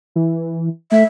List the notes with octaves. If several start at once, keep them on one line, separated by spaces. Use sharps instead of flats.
E3
A3 E5